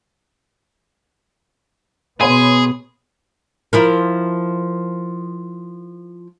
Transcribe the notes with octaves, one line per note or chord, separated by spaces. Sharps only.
B2 B3 G#4 C#5 B5 C6
F3 E4 A#4